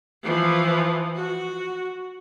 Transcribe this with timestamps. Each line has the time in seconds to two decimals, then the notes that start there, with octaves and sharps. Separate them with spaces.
0.23 E3 F3
1.15 F#4